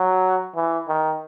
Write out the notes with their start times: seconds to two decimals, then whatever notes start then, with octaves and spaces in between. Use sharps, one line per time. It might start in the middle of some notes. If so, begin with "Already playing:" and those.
Already playing: F#3
0.55 E3
0.88 D#3